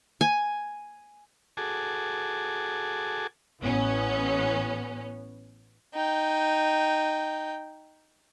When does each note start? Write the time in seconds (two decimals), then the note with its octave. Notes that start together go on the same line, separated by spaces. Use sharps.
0.21 G#5
1.57 F#4 G#4 A4 G#5 A5 D6
3.62 A1 B3 C#4
5.94 D#4 G5